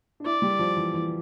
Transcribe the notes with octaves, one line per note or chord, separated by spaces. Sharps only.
D4
E4 D5
G3
F3
E3
E3